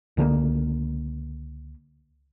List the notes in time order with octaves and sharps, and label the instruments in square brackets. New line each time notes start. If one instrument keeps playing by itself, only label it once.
[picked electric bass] C#2 D3 A3 A#3